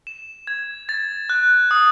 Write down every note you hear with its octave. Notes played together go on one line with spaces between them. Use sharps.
E7
G#6
A6
F#6
D#6